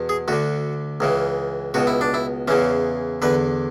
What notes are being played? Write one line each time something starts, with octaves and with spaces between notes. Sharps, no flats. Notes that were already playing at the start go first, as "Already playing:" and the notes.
Already playing: E2 B2
G#4
D2 D3 F#4
C#2 C#3 E3
C#2 B2 F#4
E4
D4
E4
E2 C#3 E3 C#4
E2 D3 B4